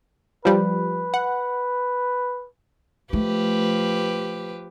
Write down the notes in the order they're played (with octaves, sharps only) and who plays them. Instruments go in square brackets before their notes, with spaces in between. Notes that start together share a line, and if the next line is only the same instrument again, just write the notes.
[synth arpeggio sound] F3 G3 [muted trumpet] B4
[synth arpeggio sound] F#5
[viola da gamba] F3 G4 B4 [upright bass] A3